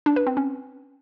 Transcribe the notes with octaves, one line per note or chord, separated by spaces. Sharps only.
D4
B4
C4
C#4